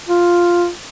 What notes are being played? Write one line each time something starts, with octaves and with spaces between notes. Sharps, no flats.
F4